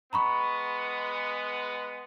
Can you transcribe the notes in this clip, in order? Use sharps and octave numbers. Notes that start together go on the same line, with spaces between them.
G#3 B3 A#5 B5 C#6